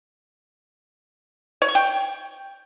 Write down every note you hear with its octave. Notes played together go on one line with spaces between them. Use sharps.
C#5
C#6
G5